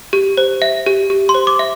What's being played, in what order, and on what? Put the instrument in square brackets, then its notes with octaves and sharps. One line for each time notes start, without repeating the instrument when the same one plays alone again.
[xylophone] G4
C5
E5
G4
G4
C6
C5
D6
E5